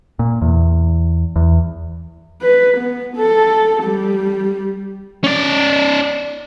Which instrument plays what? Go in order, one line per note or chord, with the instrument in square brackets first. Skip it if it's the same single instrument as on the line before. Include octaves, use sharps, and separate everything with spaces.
[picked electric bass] A#2
E2
E2
[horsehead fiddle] B4
B3
A4
G3
[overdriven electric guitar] C#4 D5